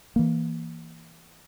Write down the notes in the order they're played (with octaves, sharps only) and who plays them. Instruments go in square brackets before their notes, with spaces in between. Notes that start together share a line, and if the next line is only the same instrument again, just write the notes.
[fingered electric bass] E3 A#3